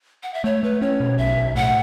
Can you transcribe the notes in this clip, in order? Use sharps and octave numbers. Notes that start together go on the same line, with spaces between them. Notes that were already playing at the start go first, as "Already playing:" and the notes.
F#5
E5
A3 C#5
A3 B4
C#4 C#5
B2
B1 E5
B1
A2 F#5